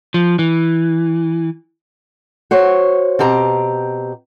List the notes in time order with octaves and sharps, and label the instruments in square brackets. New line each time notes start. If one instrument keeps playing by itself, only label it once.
[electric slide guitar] F3
E3
[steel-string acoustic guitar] F#4 C5 C#5
B2 C4 G4 A#5